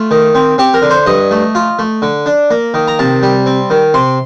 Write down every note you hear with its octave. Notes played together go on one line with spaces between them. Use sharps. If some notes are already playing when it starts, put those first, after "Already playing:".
Already playing: A3 F4
D#3
C4
C4 G4
A#4
D3
C5
G2 D#5
A3
F4
A3
D3
D4
A#3
D#3
A#5
C3 A5
G3
C4
D#3
C3 C6